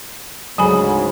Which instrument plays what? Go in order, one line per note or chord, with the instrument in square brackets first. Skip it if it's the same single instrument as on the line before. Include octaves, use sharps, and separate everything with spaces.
[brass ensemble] D2 G#2 C#3 [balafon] F#3 G#5 B5